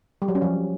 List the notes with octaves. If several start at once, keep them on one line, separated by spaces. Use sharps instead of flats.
G3
F#3
C#4
F3